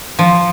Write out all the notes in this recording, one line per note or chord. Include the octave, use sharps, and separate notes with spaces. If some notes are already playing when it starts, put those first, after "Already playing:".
F3